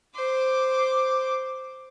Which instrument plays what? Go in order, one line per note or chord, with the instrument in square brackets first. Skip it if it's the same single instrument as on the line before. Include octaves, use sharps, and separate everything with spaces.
[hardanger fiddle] C5 D6